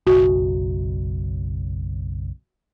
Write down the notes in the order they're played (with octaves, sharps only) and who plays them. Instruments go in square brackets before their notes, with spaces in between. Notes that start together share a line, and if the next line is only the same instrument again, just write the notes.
[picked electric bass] F#1 B1 [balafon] F#4